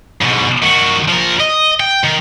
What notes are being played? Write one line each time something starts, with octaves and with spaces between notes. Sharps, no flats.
G#2 B2
D#3 F#4
F3 A#4
D#5
G5
D#3